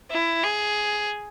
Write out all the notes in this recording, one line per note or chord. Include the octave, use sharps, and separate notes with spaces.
E4
G#4